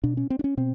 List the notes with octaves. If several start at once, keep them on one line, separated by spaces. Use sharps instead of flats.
B2 D4
C#4
C4
D4
C#4
B2 C4